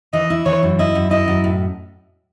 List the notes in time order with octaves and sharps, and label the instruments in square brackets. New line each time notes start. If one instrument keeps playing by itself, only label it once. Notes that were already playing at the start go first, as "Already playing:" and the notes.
[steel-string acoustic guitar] E3 [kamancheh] D#5
[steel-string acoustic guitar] E4
[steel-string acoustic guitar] E3 [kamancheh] C#5
[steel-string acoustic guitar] F#2
[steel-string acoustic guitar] E4 [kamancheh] D#5
[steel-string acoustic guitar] F#2
[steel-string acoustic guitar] E4 [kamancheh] D#5
[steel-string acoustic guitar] F#2
A2